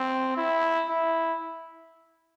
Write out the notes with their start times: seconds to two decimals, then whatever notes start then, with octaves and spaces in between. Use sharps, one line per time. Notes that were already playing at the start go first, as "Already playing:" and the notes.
Already playing: C4
0.37 E4
0.89 E4